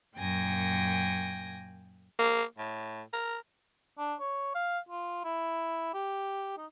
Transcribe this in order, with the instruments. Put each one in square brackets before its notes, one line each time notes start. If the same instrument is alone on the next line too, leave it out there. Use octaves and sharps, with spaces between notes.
[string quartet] F#2 A#2 G5 G#5 A#6
[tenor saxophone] A#3
A2
A#4
[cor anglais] D4
C#5
F5
F4
E4
G4
D#4